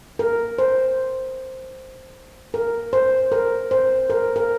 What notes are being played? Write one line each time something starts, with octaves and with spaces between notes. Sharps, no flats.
A#4
C5
A#4
C5
A#4
C5
A#4
A#4